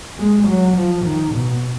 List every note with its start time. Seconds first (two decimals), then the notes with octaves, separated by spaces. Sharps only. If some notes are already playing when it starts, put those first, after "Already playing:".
0.19 G#3
0.47 F#3
0.77 F3
1.05 D#3
1.35 B2